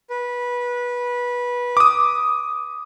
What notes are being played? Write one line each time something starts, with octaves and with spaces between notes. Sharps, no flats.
B4
D6 D#6